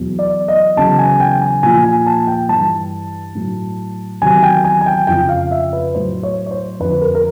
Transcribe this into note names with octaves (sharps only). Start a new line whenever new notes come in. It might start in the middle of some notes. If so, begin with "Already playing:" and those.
Already playing: E2 B2 F#3
D5
D#5
E2 C#3 F#3 A5
G#5
G5
G#5
A#2 F3 G#5
G#5
A5
G5
G2 E3 A5
A2 F#3
E2 C3 D#3 F#3 G#5
G5
G#5
G#5
G5
F2 C#3 F3 G5
F5
E5
B4
A2 F#3 C5
C#5
C#5
C5
F2 D3 F3 B4
A#4
A#4